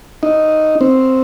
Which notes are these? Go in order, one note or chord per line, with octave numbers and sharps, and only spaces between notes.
D#4
C4